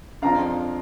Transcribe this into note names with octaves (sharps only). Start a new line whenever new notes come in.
F2 F3 D4 F5 A#5